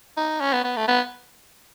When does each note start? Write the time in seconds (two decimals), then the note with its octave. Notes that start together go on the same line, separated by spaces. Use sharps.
0.17 D#4
0.41 C#4
0.53 B3
0.64 B3
0.76 A3
0.88 B3